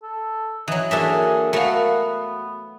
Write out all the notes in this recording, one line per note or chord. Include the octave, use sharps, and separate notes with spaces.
A4
E3 F#3 D#5
D3 F#3 A#3 G#4 E5 A5
A3 B3 F#4 A#4 F5